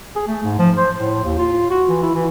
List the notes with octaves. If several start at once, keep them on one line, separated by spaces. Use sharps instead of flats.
G#4
A3
G#2
F3
C5
A2
D#2
F4
F#4
E3
E4
E3